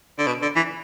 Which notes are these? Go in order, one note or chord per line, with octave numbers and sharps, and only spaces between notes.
D3
B2
D3
E3